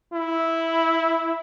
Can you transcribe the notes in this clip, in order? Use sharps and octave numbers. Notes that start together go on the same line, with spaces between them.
E4